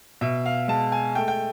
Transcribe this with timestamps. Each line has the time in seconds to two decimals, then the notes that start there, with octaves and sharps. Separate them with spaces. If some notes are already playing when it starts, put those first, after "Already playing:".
0.21 B2 E5
0.46 F5
0.68 G#3 A5
0.92 G#5
1.15 A3 G5
1.28 G5